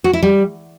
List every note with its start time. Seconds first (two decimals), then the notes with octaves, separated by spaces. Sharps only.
0.04 F#4
0.13 E4
0.23 G3